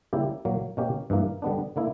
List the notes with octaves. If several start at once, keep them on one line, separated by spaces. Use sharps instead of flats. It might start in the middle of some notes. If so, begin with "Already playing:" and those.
C#3 G3 A#3 E4 G4
A#2 F#3 A#3
B2 A#3 C#4 G4
G2 E3 A#3
D3 G3 B3 D4
D3 A#3 E4